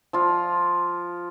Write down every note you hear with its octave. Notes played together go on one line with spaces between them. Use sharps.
F3 F4